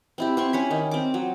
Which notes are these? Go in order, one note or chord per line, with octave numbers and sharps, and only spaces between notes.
C4 E4 G4
C4 C6 C#6
C#4 C#5 B5
D#3
C4 D6
F#3